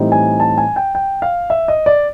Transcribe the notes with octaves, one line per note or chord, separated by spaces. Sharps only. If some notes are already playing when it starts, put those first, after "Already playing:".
Already playing: A2 E3 G3 C4 D#4
G#5
A5
G#5
G5
G5
F5
E5
D#5
D5